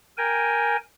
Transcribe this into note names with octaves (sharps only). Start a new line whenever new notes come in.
A#4 G5 G#5